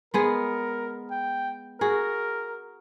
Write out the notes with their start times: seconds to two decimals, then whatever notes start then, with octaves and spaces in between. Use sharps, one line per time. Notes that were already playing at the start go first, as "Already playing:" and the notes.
0.14 G#3 B3 G#4 A#4
1.11 G5
1.81 F#4 G#4 A#4